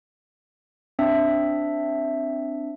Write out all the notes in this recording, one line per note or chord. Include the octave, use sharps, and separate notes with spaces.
C4 D4 E5